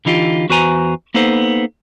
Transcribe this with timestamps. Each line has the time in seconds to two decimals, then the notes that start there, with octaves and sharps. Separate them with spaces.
0.05 D3 E3 D#4 F4 G4
0.50 E2 F#4 B4 C5 G#5 A#5
1.14 A#3 B3 D#4 A4 C5